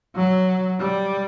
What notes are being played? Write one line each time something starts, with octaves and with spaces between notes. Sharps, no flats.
F#3
G3